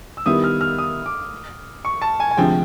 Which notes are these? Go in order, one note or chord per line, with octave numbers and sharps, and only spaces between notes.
E6
D#3 G3 B3 E4 D#6
F6
F6
D#6
D6
C#6
A5
G#5
G#5
D2 C3 F3 G#3 G5